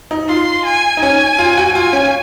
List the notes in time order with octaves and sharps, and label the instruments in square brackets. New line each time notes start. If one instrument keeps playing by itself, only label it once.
[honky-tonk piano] D#4
[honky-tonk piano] F4 [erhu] C6
[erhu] G#5
[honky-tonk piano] D#4
[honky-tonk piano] C#4 [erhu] G#5
[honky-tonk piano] F4
F#4
[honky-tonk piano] F4 [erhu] G#5
[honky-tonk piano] C#4